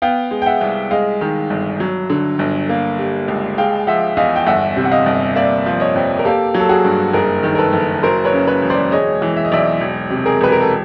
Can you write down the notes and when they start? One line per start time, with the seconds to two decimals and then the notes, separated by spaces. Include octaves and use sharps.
0.02 B3 F5 G5
0.31 G#3
0.42 G5
0.46 E5 F#5
0.61 C2
0.91 G#3 D#5 F5
1.21 D#3
1.50 G1
1.80 F#3
2.10 D3
2.39 G1
2.69 A#3
2.99 G3
3.28 C#2
3.58 G#3 F5 G5
3.87 F3 E5 F#5
4.17 E2 D#5 F5
4.36 G5
4.46 G1 E5 F#5
4.76 C3
4.85 F#5
4.91 D#5 F5
5.06 G1
5.35 A#3 D5 E5
5.66 F3
5.80 C#5 D#5
5.95 F2
6.19 A#4
6.25 A#3 G4 A4
6.54 F#3
6.60 A4
6.69 F#4 G#4
6.85 G2
7.13 F#1 G#4 A#4
7.43 D#3
7.55 A#4
7.58 A4 B4
7.73 F#1
8.03 F#3 A#4 C5
8.25 B4 C#5
8.32 C#3
8.47 B4 C#5
8.62 E1
8.70 C5 D5
8.92 G#3 C#5 D#5
9.22 E3
9.36 E5
9.45 D#5
9.52 B1 D5 E5
9.81 E1
10.10 C3
10.26 G#4 A#4
10.41 E1 B4
10.52 A#4
10.61 A4